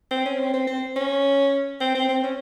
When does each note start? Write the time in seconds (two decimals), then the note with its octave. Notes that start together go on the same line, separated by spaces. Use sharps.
0.11 C4
0.26 C#4
0.39 C4
0.54 C4
0.67 C4
0.96 C#4
1.81 C4
1.95 C4
2.09 C4
2.24 C#4